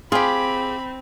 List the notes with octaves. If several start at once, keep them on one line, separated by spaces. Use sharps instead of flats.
C4 F4 G4 G#4 B5